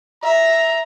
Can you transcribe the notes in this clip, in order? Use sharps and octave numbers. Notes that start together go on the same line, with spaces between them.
E5 A#5